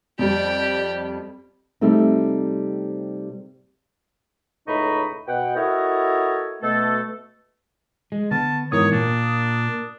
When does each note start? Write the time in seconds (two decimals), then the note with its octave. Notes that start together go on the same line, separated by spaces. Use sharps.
0.19 F2 G3 G4 D5
1.81 C3 G3 A3 C4 D#4
4.67 C#2 A2 D#4 D#5 B5 C#6
5.28 B2 F#5 G5
5.56 E4 F#4 A4 A#4 C#5 D#5
6.62 B2 A3 A4
8.12 G#3
8.31 D3 B3 A5
8.72 G#2 E3 B3 A#4 C#5 D#6
8.92 A#2 A#3 D4